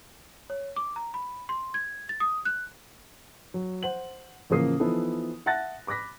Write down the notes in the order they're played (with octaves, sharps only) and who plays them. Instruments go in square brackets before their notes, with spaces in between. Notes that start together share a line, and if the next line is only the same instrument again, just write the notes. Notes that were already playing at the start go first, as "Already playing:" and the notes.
[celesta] C#5
D6
A#5
B5
C6
G#6
A6
D#6
F#6
[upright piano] F#3
C5 F#5 F#7
A1 C#3 F3 A#3 D#6 C7
E3 F3 B3 D#4 E4 A4
E5 F#5 A5 F#6 A6 A#6
B5 D6 F#6 A#6 B6